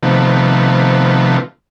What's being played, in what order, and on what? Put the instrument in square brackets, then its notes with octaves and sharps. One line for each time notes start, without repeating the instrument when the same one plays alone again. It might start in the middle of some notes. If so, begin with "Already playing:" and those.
[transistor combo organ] C3 D#3 F3 A3 B3